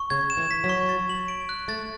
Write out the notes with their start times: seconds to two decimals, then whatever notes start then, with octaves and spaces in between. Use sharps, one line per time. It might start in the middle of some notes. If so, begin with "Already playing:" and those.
Already playing: C#6
0.10 C#3 G#6
0.30 E7
0.37 E3
0.51 B6
0.64 F#3
0.69 C#6
0.89 A6
1.09 F#7
1.28 D7
1.49 F#6
1.68 A3 A6